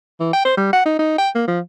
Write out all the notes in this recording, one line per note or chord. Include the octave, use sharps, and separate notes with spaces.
E3
G5
C5
G3
F#5
D#4
D#4
G5
A#3
F3